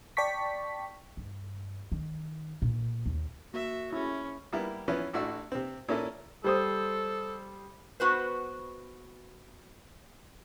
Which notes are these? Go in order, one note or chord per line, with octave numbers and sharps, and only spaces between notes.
D5 G5 A5 C#6 B6
G2
D#3
A#2
D#2
A#3 F#4 E5
C#4 E4 G#4
G3 A#3 B3 E4
E3 F3 B3 C#4 E4 B4
A1 A3 D4 E4 F#4 E6
C3 C4
A#2 A#3 C#4 E4 A4
G3 A4 C5 D#6
B3 F#4 B4 C5